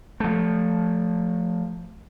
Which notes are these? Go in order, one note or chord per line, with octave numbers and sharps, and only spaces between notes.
F3 A3